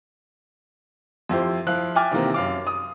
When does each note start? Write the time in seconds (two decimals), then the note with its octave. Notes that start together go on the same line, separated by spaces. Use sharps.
1.29 F2 E4 G4 C5
1.67 F3 E4 F5 F#6
1.95 E5 G5 G#5 D6 F6 A6
2.11 C3 D#3 E3 A#3 C4
2.34 F#2 F5 D6
2.67 D#6